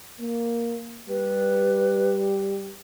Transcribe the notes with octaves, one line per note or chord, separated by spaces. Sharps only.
A#3
G3 G4 B4